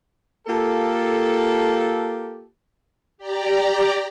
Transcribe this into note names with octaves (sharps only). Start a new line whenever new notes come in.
A#3 F4 G4 A4
G4 D5 A#5